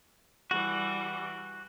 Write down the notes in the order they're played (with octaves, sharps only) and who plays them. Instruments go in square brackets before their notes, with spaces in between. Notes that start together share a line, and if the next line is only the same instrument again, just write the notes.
[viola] E3 G3 [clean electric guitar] F#4